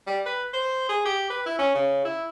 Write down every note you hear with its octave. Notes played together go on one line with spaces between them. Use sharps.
G3
B4
C5
G#4
G4
B4
E4
C#4
C#3
E4